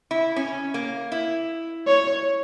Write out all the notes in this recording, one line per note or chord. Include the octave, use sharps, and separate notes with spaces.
E4
C#4
A#3
E4
C#5